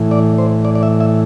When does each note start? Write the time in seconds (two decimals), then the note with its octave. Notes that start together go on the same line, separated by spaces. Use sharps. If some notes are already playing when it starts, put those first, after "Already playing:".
Already playing: A2 E3
0.11 D5
0.38 C5
0.65 D5
0.75 D5
0.83 E5
1.00 E5